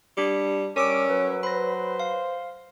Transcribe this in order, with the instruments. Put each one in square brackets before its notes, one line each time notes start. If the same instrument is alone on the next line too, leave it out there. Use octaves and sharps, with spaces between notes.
[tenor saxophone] G3 [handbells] D4 C#7
[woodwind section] G3 D6 [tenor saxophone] C#4 [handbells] A#4 E6 D7
[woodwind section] F#3 B4
[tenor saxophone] C5 [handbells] B5 A#6
[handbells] F5